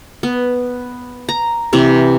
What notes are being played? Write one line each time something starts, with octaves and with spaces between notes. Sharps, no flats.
B3
A#5
C3 E3 C4